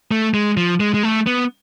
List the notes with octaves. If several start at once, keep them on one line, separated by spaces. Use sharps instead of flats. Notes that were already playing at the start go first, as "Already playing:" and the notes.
A3
G#3
F3
G#3
G#3
A3
B3